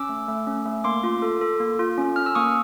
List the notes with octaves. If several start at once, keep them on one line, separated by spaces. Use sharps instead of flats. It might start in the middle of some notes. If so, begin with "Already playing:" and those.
Already playing: C#4 D6 E6
A3
A3
C#4
A3
A#3 C6 D6
F4
A4
A4
A#3
F4
C#4
C#4 F6
E6
A#3 C#6 D#6